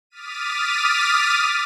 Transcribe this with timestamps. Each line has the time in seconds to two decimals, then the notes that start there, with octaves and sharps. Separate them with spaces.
0.10 D6 D#6 F6 A6 B6 D#7